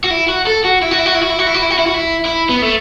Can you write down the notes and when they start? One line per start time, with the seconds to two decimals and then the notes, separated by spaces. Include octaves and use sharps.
0.04 F#4
0.11 E4
0.28 F#4
0.46 A4
0.64 F#4
0.82 E4
0.91 F#4
0.99 E4
1.06 F#4
1.15 E4
1.22 F#4
1.30 E4
1.39 F#4
1.47 E4
1.54 F#4
1.62 E4
1.70 F#4
1.78 E4
1.87 F#4
1.94 E4
2.25 E4
2.49 B3
2.62 A3